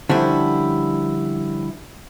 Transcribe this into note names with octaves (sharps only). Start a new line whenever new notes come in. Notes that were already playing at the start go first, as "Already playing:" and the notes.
D3 F3 G3 C#4 D4 E4